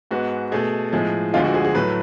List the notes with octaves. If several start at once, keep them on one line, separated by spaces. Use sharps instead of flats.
G#2 G#3 B3 F#4
B2 A3 G#4
A2 F3 G#3 G#4
D2 D3 F3 G#3 F4
F#4
G#4
G#4
A2 F#3 A3 B4